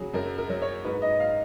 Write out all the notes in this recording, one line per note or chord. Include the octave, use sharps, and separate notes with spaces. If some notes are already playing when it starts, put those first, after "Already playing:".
Already playing: C#3 F#3 F#4 G#4
F#2 A#4
A#4
F#3
C#5
G#2 B4
D#5
F5